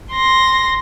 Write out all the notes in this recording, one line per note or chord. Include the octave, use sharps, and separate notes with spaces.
C6 A#6